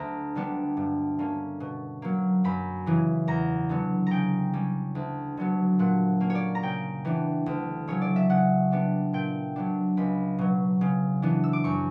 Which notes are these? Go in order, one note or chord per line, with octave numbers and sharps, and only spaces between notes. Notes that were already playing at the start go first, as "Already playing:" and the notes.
Already playing: D2 A#5
D3 G3 B3 D4
G2
D3 A#3 C#4
B2
F#3 A#3
F#2 B5
C#3 E3
E2 A#5
D3 F#3 B3
C#3 G5 A#5
G3 C#4
D2
D3 F#3 B3
A#2 F#5
A#3 C#4
C#5
D5
A#5
C#3 G5
E3 B3 D4
D2
C#3 F#3 C#5
D5
E5
C#3 F#5
G3 B3 D4
A#2 G5
F#3 B3 D4
C#2 B5
B2 F#3
C#3
E3 B3 D4
E6
D6
F#2 C#6